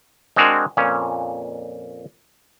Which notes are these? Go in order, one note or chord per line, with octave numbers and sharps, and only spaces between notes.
G#3 C4 D4 F#4 G#4 A#4
F2 A#2 C#4